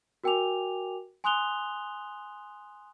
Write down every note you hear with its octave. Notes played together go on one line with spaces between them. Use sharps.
F#4 A#4 G5 G#5 D6 F7
G#5 C6 D#6 F#6 F7 G7